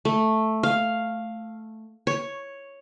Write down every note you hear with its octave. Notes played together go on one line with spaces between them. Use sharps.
A3
F5
C#5